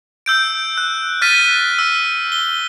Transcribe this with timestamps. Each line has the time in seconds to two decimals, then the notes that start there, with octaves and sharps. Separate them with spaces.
0.26 E6 G6 D7
0.78 F#6
1.22 F6 F#6 A6 B6 D#7
1.79 E6
2.32 G7